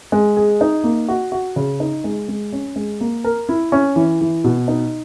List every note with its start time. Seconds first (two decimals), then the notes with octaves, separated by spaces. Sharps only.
0.12 G#3
0.37 G#4
0.61 D#4
0.84 A#3
1.08 F#4
1.32 F#4
1.56 C#3
1.80 D#4
2.04 G#3
2.28 G#3
2.52 C#4
2.76 G#3
3.00 A#3
3.24 A#4
3.49 E4
3.72 C#4
3.96 E3
4.21 E3
4.44 B2
4.68 D#4